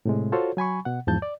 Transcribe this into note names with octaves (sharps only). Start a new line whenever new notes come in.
A2 C3 G#3
F4 F#4 A4 C5 C#5
F#3 G#5 B5 C#6
B2 F#5
E2 G#2 F3 A5 G6
D5